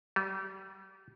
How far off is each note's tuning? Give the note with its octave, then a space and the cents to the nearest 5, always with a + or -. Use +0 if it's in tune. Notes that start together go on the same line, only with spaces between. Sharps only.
G3 -35